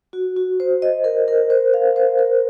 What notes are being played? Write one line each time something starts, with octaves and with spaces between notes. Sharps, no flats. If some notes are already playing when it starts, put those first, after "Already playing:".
F#4
F#4
C5
D#5
A#4
A#4
C5
F5
C5
A#4